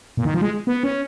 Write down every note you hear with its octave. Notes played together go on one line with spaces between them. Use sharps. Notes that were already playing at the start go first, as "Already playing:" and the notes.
A#2
D#3
F3
G#3
B3
C#4